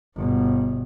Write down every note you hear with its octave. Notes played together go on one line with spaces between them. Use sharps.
G1 B2